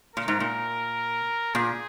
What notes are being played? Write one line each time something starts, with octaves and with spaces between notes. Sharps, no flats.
A#2 A#4
G#2
A#2
A#2 G#4